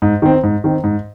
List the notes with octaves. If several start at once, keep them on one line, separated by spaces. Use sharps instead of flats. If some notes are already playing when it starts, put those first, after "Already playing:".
G#2
D#3 C4
G#2
D#3 C4
G#2